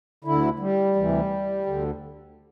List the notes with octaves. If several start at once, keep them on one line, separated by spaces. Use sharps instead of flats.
D2 D3 E4
G3
D2 C3 E3
D2 D3